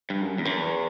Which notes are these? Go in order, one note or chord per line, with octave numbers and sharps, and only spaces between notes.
G2
F#2
E2
F#2
E2